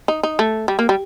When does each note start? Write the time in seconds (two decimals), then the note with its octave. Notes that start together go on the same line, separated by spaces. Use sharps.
0.08 D#4
0.23 D#4
0.39 A3
0.68 G3
0.79 A#3
0.89 G3